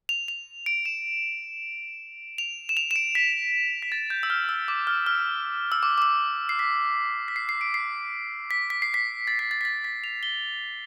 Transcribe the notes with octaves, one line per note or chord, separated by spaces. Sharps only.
F7
F7
D7
E7
F7
E7
F7
E7
D7
B6
B6
A6
G6
E6
F6
E6
D6
F6
F6
E6
D6
D6
E6
C7
B6
B6
C7
C7
D7
C7
B6
B6
C7
B6
A6
B6
A6
B6
A6
B6
F7
G7